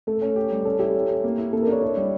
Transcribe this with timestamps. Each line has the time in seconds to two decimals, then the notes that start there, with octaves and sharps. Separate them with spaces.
0.07 A3 A4
0.22 C#4
0.36 G4
0.51 G3
0.65 C#4 A4
0.79 E4 G4
0.94 C#4
1.09 E4
1.24 A#3
1.38 E4
1.53 A#3 A4
1.63 D4 A#4
1.72 C#5
1.82 E4
1.97 G3